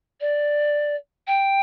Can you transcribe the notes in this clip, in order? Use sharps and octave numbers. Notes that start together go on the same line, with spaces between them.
D5
G5